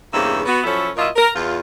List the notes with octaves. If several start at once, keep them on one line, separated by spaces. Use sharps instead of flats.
E2 G2 C#3 A#3 C5 E5
B3 F#4
F3 F#3 C#4 E4 A4
A#2 F#3 E4 F4 D#5
A#4
E2 F4